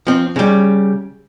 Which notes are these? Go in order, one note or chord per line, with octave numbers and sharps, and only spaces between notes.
F3 C4
C#3 G3